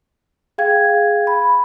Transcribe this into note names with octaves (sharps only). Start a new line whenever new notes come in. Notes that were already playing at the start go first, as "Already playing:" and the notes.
G#4 F5 G5 G#6
B5